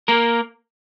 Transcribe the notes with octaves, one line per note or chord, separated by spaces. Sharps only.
A#3 A#4